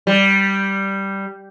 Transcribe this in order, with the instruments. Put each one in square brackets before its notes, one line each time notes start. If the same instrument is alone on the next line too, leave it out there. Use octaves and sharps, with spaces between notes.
[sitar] G3